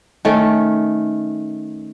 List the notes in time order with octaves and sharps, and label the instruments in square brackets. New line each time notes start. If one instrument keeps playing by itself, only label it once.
[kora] D#3 A3 C#4